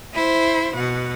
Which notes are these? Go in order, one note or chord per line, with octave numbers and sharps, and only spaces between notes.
E4 C5
B2 F#5